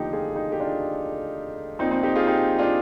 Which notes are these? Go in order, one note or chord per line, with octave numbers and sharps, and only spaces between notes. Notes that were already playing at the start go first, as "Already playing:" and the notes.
Already playing: F1 D#2 D3 F3 D#4 G4
F4 G#4
D#4 G4
G4
D4 F4
A#1 A#2 F3 C4 D#4
C4 D#4
D#4 G4
F4 G#4
D#4 G4
D4 F4